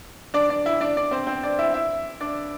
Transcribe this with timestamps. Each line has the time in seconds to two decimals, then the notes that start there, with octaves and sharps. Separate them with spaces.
0.34 D4 D5
0.49 D4 D5
0.66 E4 E5
0.81 D4 D5
0.97 D4 D5
1.11 C4 C5
1.27 C4 C5
1.43 D4 D5
1.59 E4 E5
1.74 E4 E5
2.21 D4 D5